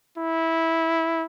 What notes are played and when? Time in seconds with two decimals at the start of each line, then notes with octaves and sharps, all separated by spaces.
0.18 E4